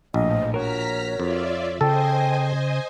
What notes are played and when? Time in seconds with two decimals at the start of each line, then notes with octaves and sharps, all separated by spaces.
0.14 A#1 A2 F3 D#5
0.54 F#4 A#4 C#5 A#5 F6 B6
1.20 F2 F4 D5 E5
1.81 C#3 A4 C5 D#5 G5 G#5